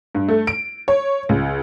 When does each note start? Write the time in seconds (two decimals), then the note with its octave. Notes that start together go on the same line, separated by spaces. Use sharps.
0.15 G2
0.28 A3
0.47 D7
0.88 C#5
1.29 C#2